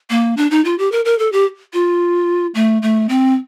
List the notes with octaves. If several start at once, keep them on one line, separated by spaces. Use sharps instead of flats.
A#3
D4
D#4
F4
G4
A#4
A#4
A4
G4
F4
A3
A3
C4